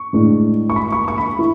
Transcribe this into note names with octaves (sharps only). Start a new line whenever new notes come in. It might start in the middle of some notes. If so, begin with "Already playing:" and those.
Already playing: C#6
A2 G#3 D4
C#6
B5
C#6
C#6
B5
E4